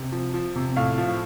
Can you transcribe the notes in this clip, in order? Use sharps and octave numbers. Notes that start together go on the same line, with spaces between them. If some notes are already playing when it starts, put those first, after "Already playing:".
Already playing: C3
F3
F3
C3
A2 F5
F3